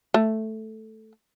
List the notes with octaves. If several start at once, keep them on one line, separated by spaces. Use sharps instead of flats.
A3